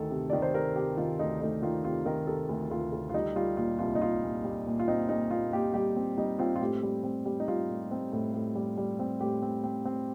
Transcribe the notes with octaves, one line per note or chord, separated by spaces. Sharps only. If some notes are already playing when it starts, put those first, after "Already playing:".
Already playing: D2 D#3 A4
C3
D#3 D5
C5
C3 A#4
C3 G4
D#3 F4
D2 D#4
A3 D#4
D#3 F4
C3 F4
D#3 A#4
C3 A4
D2
D2 F4
D2
F4
G3 D#4
G3 F4
A#2 F4
C2 F4
D#4
A#2 F4
A#2
G3
A#2
F4
C4 D#4
A#2 D#4
A#2 F4
A#2 G4
G3 G4
C4
G3 D#4
C4 F4
F4
A2 G4
G3
C4
G3
D#4
G3 F4
A2
C4
A2
A2
G3
G3
C4
A2 G4
C4
C4
C4